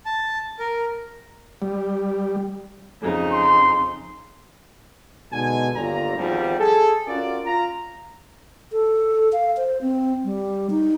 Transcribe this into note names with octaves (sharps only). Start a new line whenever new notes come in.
A5
A#4
G3
F2 C#3 D#4
C6
B2 D3 G#3 D#4 G#5
G1 D#2 F4 D5 A#5
G#1 E2 G#2 F3 G3
G#4 A4
C#4 F4 F#4 A#4 D5
F4 A#5
A4
F5
C5
C4
G3
D#4